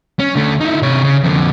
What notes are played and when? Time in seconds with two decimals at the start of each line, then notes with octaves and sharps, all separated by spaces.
0.19 C#4
0.36 D3 A3
0.60 D#4 E4
0.82 C3 C#5
1.04 C#3
1.24 F2 D3